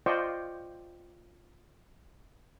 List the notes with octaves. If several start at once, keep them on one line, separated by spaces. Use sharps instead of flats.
F4 C5 D5 D#5 G5 C#6